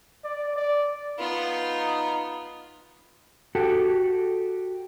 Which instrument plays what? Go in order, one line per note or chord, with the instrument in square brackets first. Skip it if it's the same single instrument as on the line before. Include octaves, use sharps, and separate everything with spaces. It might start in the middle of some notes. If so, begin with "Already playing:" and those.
[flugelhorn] D5
D5
[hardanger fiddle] B3 F4 [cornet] D#4
[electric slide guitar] F#4 G4 A4